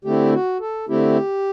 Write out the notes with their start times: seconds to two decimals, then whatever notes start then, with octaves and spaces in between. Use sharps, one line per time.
0.05 D3 A3 C4 E4 G4
0.33 F#4
0.60 A4
0.88 D3 A3 C4 E4 G4